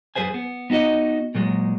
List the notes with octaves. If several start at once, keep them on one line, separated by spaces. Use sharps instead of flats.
F#2 G#4 B4 C5 G#5
B3
B3 D#4 F#4 D#5
A#2 F#3 G#3